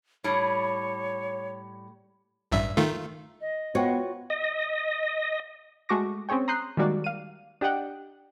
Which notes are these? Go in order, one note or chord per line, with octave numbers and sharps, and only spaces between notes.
A2 G3 C#5
A1 G2 E5
D#3 A3 F4
D#5
B3 F4 F#4 C5 C#5 G5
D#5
G#3 A3 F#4 C#6 D6 A#6
C4 C#4 G#4 C#5 G5
A#5 C6 D#6 F#6 G6 C7
D#3 G3 G#3 A#3 F#4 D5
F5 D#7
D4 G4 D#5 F#5 G5